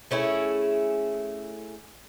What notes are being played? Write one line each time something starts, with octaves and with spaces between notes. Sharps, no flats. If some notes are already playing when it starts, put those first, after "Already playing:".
A3 C#4 E4 G#4